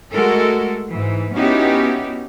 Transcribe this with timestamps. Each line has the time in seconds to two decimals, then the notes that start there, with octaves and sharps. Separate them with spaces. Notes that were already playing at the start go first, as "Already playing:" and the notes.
0.15 G#3 A3 F#4 A4 A#4
0.91 G#2 E3
1.34 B3 C#4 D#4 E4 F#4 G4